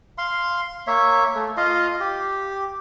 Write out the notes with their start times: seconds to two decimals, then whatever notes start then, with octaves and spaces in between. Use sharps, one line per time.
0.18 F5 C6
0.87 A#3 C#5 E5
1.35 A3
1.57 F4 D#5 F5
2.00 G4